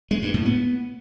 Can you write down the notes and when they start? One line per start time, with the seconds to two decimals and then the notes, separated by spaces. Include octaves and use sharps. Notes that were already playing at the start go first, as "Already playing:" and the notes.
0.11 G#3
0.22 G2
0.34 A2
0.45 B3